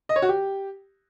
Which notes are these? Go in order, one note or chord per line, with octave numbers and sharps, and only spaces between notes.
D#5
C#5
F#4
G4